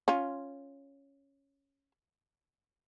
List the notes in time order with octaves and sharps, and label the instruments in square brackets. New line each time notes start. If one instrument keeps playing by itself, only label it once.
[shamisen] C#4 F4